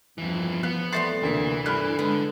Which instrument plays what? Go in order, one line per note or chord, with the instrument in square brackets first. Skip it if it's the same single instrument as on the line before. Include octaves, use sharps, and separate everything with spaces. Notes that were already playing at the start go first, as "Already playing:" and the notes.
[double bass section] E2 F3 [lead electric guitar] G2 E3
[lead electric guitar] B3 [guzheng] F5 [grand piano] F#6
[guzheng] G3 A3 C5 [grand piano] C6 A6 C7
[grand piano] D2 A#3 B6 [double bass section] C3 [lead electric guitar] E3
[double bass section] G2 [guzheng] D3 [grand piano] B5 F6 F#6
[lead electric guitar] D3 [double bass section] G#3 [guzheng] B3